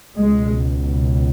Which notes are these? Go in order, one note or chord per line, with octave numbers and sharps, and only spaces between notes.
C#2 B2 G#3